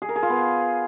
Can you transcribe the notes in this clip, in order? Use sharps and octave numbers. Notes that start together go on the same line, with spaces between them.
G#4
A#4
G#4
F4
B3